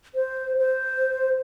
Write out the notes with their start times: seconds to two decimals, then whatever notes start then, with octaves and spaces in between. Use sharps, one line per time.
0.15 C5
0.58 C5